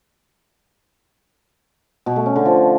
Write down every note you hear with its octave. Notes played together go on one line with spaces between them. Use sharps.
B2
A3
C#4
D3
F3